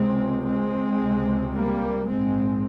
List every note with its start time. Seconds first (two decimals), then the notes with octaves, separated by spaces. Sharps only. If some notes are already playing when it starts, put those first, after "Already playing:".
Already playing: C#2 C3 G#3 C4
0.45 G#3 C4
0.99 C#2 C3
1.53 G3 A#3
2.07 A#1 G#2 G#3 C4